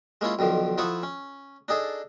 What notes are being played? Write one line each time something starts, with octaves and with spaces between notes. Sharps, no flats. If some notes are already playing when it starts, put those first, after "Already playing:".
G#3 A#3 C#4 E4 F4
B1 D3 D#3 F3
F3 E4 A4 F#5 C#6 D#6
C#4
D4 D#4 G#4 A4